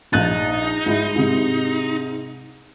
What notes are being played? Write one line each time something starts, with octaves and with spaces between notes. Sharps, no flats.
A#1 D#4 F#6 A6
G#2 E4
G#2 C3